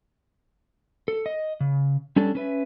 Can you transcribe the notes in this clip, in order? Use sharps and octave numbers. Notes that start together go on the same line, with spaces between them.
A4
D#5
C#3
G3 C#4 D4 A4
C#4 B4 E5